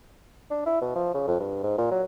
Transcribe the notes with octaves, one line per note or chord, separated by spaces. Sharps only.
D4
E4
B2
F3
C#3
F2
G2
G#2
A#2
F#3